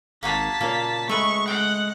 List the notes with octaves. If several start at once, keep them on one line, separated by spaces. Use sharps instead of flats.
G#1 A#3 F#4 G#4 A5 B6
A#2 C#3 A#3
G#3 A3 B4 C#6
F#5 G5